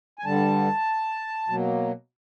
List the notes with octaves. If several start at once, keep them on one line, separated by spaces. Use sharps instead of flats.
G#5
G2 D3 G3 A5
B2 F#3 A#3